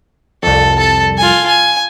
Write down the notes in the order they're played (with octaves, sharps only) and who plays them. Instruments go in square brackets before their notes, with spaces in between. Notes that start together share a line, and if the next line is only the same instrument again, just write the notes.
[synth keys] C2 F2 [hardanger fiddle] A4
[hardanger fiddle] A4 A5
F4 G#5
G#5